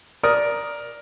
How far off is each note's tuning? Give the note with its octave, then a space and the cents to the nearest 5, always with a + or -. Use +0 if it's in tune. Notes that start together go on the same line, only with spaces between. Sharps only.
A#4 +10 D5 -5 D#6 +0